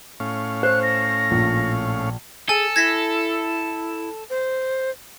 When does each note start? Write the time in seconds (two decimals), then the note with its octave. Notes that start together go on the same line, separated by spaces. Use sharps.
0.20 A2 C#4 F5
0.63 C5 F#6
0.83 A#6
1.31 A#1
2.49 G#4 A4 G#5
2.76 E4 G#6 A#6 B6
4.30 C5